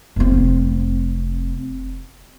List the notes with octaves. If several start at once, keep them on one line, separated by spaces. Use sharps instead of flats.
F1 C4